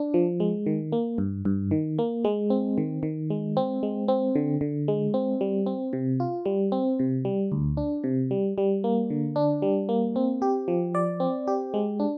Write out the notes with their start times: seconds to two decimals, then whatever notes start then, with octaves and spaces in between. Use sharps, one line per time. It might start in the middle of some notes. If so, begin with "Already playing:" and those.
Already playing: D4
0.14 F3
0.40 G#3
0.66 D#3
0.92 A#3
1.18 G2
1.45 G2
1.71 D#3
1.99 A#3
2.25 G#3
2.50 C4
2.78 D#3
3.03 D#3
3.30 G#3
3.57 C4
3.83 G#3
4.08 C4
4.35 D3
4.61 D3
4.88 G#3
5.14 C4
5.41 G3
5.66 C4
5.93 C3
6.20 F4
6.46 G3
6.72 C4
6.99 C3
7.25 G3
7.52 D2
7.77 D4
8.04 C3
8.31 G3
8.58 G3
8.84 A#3
9.10 D3
9.36 D4
9.62 G3
9.89 A#3
10.16 C4
10.42 G4
10.68 F3
10.95 D5
11.20 C4
11.47 G4
11.74 G#3
12.00 D4